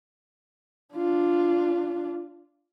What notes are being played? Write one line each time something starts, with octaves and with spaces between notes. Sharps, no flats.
D4 F4